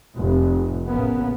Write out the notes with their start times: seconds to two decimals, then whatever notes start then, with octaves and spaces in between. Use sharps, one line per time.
0.16 F1
0.86 A1 C#3 A#3 B3